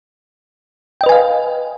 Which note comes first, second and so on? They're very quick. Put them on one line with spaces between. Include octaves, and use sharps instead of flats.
G5 D#5 B4 G#5 F5